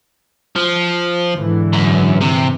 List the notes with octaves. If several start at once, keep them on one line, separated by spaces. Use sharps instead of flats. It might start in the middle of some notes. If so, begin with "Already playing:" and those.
F3
G#2 D3 E3
F#2
C3